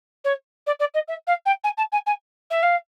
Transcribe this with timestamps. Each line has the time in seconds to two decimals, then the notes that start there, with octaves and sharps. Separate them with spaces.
0.24 C#5
0.66 D5
0.79 D5
0.94 D#5
1.08 E5
1.27 F5
1.45 G5
1.63 G#5
1.77 A5
1.92 G#5
2.06 G#5
2.50 E5
2.62 F5